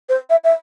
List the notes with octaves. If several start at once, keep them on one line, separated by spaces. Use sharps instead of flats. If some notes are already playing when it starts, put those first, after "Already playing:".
C5
E5
E5